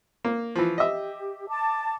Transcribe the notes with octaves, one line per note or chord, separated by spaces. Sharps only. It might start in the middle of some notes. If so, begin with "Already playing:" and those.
A#3
E3 F3
G4 D#5 E5
A5 D6